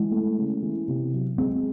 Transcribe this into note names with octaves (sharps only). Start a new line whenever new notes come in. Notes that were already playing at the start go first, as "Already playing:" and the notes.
Already playing: E3 G#3
A3
C#3
E3
C3
F#3
G#3 C4